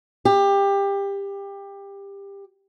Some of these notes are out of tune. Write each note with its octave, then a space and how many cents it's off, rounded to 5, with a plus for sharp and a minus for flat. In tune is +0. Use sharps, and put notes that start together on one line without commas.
G4 +20